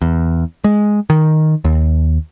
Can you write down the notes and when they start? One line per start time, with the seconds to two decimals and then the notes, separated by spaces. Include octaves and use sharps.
0.02 E2
0.64 G#3
1.10 D#3
1.64 D#2